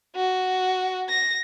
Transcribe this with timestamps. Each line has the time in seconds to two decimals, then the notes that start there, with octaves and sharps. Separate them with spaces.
0.16 F#4
1.09 A#6